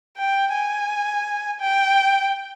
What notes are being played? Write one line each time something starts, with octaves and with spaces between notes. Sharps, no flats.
G5
G#5
G5